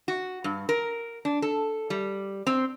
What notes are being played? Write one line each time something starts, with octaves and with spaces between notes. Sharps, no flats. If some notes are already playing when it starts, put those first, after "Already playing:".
F#4
G2
A#4
D4
A4
G3
C4